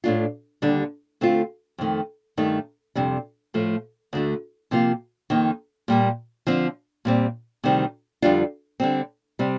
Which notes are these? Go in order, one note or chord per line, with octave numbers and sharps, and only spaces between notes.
A2 A3 D4 F4
D#2 D3 G3 D4
D3 A3 C4 F4
F2 D#3 A3
G2 D#3 A3 D#4
F2 C3 G3 D4
A2 F3 A3
D2 D3 A3
C3 F3 A#3 F4
F2 D#3 A#3 D#4
A#2 G3 A#3
D3 F3 C4
A#2 G3 C4
D2 C3 D#3 G3 C4
F2 D3 G3 D4 F4
D3 G3 C4
C3 G3 C4